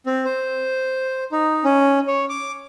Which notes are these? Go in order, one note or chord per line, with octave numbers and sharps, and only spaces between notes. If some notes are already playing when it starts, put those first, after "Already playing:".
C4
C5
D#4
C#4
C#5
D6